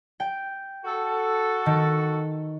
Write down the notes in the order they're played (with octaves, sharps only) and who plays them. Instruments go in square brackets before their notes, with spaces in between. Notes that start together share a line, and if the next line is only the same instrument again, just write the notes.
[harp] G5
[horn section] F#4 A4
[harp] D#3